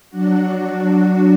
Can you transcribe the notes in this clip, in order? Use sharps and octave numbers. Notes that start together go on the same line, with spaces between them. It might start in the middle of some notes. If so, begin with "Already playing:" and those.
F#3 D4 F#4